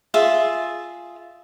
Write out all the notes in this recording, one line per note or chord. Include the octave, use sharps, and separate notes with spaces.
F4 G#4 E5